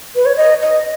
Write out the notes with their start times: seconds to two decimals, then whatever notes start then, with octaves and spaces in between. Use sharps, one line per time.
0.15 B4
0.26 C#5
0.37 D#5
0.61 D#5